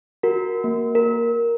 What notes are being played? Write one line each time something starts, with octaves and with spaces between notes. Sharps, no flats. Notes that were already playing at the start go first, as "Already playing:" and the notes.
F#4 A#4
A#3
A#4